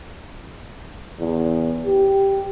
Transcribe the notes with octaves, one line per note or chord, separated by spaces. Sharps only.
E2
G4